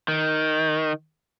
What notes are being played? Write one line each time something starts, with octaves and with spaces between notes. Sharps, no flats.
D#3